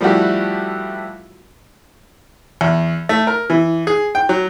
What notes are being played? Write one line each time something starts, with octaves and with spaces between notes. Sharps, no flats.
F3 G3 A3 E4 F#4 G4
E2
A3
A#4
E3
G#4
G5
F#3